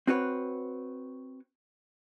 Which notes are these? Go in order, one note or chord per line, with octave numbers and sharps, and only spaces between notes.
C4 F#4 B4 C#5